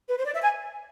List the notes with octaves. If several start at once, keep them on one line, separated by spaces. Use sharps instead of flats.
B4
C5
D5
E5
G#5